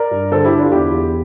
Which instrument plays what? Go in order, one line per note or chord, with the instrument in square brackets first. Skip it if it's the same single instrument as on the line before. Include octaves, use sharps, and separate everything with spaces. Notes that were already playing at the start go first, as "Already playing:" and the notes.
Already playing: [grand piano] A#4 D5
G2
D3 A4 C5
E4 G4
D3
D4 F4
E2 E4 G4
E2